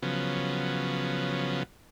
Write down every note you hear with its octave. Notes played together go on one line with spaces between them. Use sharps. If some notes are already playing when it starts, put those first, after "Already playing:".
C#3 F3 F#3 B3